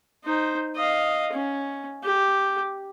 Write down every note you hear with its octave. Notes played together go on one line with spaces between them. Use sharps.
D#4 C5
D#5 F5
C#4
G4